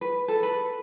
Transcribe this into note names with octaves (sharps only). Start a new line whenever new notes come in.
B4
A4
B4